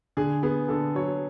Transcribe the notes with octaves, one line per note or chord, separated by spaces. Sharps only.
D3 G#4
B3 G#4
D3 A4
F#3 C#5